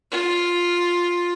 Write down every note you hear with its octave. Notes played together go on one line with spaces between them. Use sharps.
F4